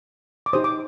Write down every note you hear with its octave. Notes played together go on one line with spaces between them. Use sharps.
D6
D#4 G4 C5 D#6
D6